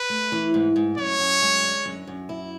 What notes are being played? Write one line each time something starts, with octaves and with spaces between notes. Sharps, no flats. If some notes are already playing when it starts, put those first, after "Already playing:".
Already playing: B4
A3
E3
G#2
G#2
F#2 C#5
F#2
G#3
D3
F#2
F#2
E4